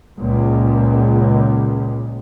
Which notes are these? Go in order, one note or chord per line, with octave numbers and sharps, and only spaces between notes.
C#2 A#2